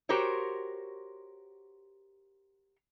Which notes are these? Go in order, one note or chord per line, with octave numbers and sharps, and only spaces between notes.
F#4 G4 A#4 C5 C#5